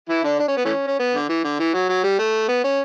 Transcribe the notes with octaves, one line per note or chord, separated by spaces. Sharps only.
E3 E4
D3 D4
D4
C#4
B3
E3 A3 C#4
C#4
B3
D3
E3
D3
E3
F#3
F#3
G3
A3
B3
C#4